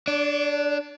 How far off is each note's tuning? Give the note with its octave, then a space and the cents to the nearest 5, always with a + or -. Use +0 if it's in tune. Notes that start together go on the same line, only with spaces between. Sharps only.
D4 +0 D5 -45